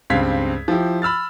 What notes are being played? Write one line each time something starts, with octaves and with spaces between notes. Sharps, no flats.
C#2 G2 C4 F5 G#6 B6
F3 E4 G4
B5 E6 F6 A6